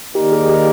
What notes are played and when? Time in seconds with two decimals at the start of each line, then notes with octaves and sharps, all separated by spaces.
0.15 D#3 A#3 D#4 G4 A#4 D5
0.32 G#4
0.49 G4